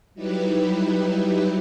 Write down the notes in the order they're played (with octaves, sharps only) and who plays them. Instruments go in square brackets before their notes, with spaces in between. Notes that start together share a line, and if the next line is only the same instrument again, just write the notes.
[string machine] F#3 G3 D#4 E4 G4 B4